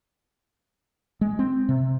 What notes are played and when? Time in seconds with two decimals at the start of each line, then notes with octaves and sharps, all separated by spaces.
1.21 G#3
1.39 C4
1.69 C3